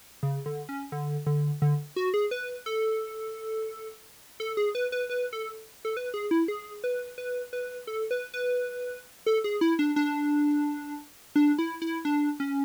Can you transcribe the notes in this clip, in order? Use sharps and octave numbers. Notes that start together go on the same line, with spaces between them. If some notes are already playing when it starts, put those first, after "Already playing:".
C#3
D3
C#4
D3
D3
D3
F#4
G#4
B4
A4
A4
G#4
B4
B4
B4
A4
A4
B4
G#4
E4
G#4
B4
B4
B4
A4
B4
B4
A4
G#4
E4
D4
D4
D4
E4
E4
D4
C#4